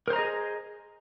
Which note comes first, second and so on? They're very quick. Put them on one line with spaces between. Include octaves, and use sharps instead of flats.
A#4 C5 A#5 D#5 G#4